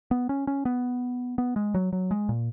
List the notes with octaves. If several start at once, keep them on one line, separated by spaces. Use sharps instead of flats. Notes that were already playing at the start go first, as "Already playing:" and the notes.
B3
C#4
C#4
B3
B3
G#3
F#3
F#3
G#3
A#2